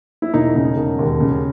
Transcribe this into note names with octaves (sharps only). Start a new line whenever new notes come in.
E4
E1 D#4
C#3
E1
D#2
C#3